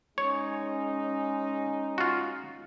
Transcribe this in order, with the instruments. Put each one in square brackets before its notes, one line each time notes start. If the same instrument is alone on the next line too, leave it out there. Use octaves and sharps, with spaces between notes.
[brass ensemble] G#3 C#4 D#4 [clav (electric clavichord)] C#5
[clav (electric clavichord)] F4 F#4